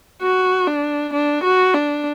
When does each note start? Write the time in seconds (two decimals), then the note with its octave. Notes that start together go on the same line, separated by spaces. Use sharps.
0.22 F#4
0.68 D4
1.13 D4
1.44 F#4
1.74 D4